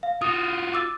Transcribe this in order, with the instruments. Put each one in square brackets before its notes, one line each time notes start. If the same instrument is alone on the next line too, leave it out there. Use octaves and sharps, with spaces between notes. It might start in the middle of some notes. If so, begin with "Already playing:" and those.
[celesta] F5
[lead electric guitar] F4 F#4 [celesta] D#6
[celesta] D6 E6 A6